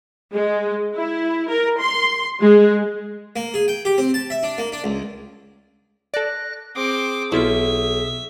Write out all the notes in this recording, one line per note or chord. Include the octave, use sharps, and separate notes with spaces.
G#3
E4
A#4
C6
G#3
A#3
G#4
G5
G4
C4
A5
E5
D4
A#3
D4
C#2
A4 D5 F#6 A#6
C4 G#4 D6 D#6
B1 E4 F4 E5